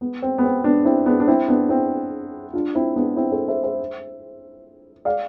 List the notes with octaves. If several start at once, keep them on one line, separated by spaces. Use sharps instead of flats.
B3
C4
B3
C4
B3 D4
C4 E4
B3 D4
D4
C4 E4
B3 D4
C4 E4
D4 F4
C4 E4
B3 D4
C4 E4
A4 C5
C5 E5
C5 E5
D5 F5